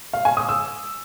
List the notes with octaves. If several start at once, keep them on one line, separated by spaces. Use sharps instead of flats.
F5
G#5
D#6
E6